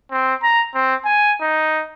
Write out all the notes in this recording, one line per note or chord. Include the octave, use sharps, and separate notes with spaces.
C4
A#5
C4
G#5
D#4